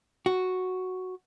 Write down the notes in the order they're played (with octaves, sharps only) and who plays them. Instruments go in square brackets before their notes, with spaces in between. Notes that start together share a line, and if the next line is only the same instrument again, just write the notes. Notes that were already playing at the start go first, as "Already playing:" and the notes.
[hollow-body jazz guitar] F#4